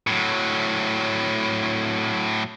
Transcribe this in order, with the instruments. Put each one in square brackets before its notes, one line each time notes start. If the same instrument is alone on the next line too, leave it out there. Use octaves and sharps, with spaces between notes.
[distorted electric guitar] A2 F#3